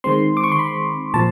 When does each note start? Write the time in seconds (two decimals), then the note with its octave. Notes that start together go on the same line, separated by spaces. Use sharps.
0.04 D#3 G#3 C4 C6
0.37 D6
0.44 C#6
0.52 C6
0.59 B5
1.14 A#2 F3 A5